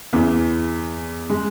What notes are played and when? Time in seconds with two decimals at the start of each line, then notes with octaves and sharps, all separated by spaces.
0.13 E2 E3
1.30 G#3